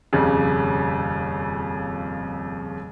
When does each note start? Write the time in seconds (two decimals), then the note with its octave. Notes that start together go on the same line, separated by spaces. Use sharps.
0.13 D#1 F2 C#3